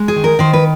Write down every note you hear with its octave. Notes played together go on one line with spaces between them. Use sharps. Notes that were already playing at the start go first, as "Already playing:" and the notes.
Already playing: G#3
G#4
D#3
A#4
D#3 C5
B4